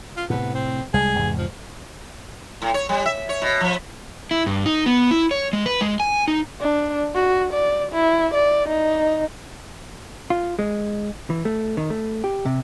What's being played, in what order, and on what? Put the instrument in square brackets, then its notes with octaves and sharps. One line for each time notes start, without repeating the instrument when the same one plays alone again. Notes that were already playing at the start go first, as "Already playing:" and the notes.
[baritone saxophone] F4
[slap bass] A2 C3 [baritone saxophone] B3
[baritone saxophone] C4
[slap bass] C2 G3 G#3 [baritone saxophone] G#4
[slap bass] E2 G#2 C3
[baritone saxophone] F3
[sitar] A2
C#5
G3
E5
C#5
B2
F3
[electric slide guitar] E4
G2
D#4
B3
E4
C#5
G#3
B4
G#3
G#5
D#4
[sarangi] D4
F#4
D5
E4
D5
D#4
[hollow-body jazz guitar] F4
G#3
E3
A3
D#3
A3
G4
C3